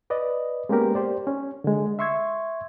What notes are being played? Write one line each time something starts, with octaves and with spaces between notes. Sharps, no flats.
B4 D5 D#5
G#3 A#3 B3 C#4 G4 A#4
G4 C5 D5
C#4
D3 G#3
E5 C6 C#6 E6 G#6